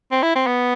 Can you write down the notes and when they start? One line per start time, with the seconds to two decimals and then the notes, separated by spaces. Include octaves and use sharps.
0.12 C4
0.23 E4
0.35 C4
0.46 B3